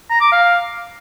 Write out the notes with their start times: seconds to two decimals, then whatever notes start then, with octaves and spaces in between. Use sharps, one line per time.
0.10 A#5
0.21 D6
0.32 F5